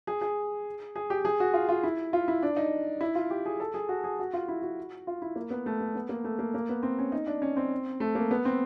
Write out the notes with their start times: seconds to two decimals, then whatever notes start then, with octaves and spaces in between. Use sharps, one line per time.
0.07 G#4
0.21 G#4
0.95 G#4
1.10 G4
1.25 G#4
1.40 F#4
1.54 F4
1.69 F4
1.83 E4
2.13 F4
2.28 E4
2.42 D4
2.57 D#4
3.01 E4
3.15 F4
3.31 G4
3.46 G#4
3.60 A4
3.74 G#4
3.89 F#4
4.04 G#4
4.19 F#4
4.33 F4
4.48 E4
4.62 F#4
5.07 F4
5.22 E4
5.36 A#3
5.50 B3
5.66 A3
5.80 B3
5.95 B3
6.09 A#3
6.24 A3
6.39 A#3
6.54 A#3
6.69 B3
6.83 C4
6.99 C#4
7.12 D#4
7.27 D4
7.42 C#4
7.57 C4
8.00 A3
8.15 A#3
8.31 B3
8.45 C4